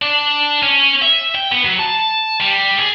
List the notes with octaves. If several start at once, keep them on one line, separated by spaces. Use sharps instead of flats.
D4
C#4
E5
G5
B3
F#3
A5
G3
G#4